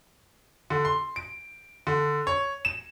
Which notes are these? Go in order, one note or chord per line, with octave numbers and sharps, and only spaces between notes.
D3
C6
D7
D3
C#5
E7